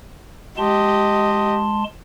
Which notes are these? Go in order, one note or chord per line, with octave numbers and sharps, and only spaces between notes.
G#3 G4 D#5 A5 C6